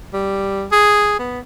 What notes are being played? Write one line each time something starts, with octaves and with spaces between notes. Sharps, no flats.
G3
G#4
B3